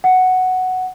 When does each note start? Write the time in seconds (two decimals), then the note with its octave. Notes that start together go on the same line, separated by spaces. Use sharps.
0.04 F#5